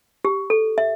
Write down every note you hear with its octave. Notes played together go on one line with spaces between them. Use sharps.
G4
A4
E5